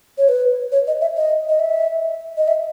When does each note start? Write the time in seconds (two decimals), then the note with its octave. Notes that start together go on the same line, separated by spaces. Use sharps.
0.18 C#5
0.29 B4
0.72 C#5
0.87 D#5
1.01 E5
1.16 D#5
1.49 D#5
1.59 E5
2.37 D#5
2.48 E5